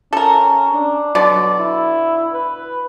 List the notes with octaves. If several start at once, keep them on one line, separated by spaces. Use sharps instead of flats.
C#4 A4 A#4
D4
B2 D3 F#3 D5
E4
B4